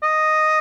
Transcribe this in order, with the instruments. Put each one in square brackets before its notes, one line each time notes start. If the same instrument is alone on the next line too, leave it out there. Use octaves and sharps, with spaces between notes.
[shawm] D#5